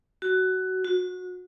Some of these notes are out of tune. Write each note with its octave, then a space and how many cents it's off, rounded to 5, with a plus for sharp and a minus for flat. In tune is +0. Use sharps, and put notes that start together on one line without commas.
F#4 +15
F#4 -25